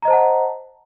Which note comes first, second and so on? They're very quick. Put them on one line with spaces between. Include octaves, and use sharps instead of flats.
A#5 D#5 C5 A5 F#5